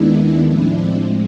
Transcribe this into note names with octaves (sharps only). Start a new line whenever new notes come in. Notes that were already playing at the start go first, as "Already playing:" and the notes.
Already playing: D#2 D#3 G#3 B3 D4 E4
A2 F3 G#3 C4 D4 E4